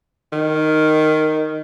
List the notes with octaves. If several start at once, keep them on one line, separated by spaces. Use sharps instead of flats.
D#3